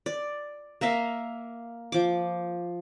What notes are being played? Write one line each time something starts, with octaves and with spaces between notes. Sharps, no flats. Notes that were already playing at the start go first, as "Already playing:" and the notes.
D5
A#3 A#4 E5 F5
F3 D6